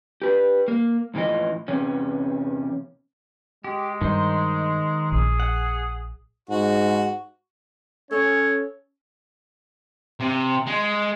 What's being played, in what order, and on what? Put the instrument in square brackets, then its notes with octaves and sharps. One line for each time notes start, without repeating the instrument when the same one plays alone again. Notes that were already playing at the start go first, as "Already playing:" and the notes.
[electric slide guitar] G4 B4
A#3
F2 A2 E3 F4 D#5
E2 C3 C#4
[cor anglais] G#3 [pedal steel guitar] G4
[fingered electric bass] G2 [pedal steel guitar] D#3 D#4 C5
[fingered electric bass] A#1 [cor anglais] G#4
[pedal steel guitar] F#5
[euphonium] G#2 [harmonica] F#4
[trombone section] C#4 [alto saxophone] A4 [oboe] C#5
[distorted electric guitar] C3
G#3